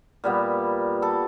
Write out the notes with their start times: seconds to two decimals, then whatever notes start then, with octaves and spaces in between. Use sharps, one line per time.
0.24 A#2 G3 B3
1.02 A4